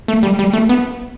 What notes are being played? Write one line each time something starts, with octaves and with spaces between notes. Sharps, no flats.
A3
G3
G3
A3
B3